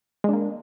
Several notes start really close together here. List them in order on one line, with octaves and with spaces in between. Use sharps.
G#3 D4 A#3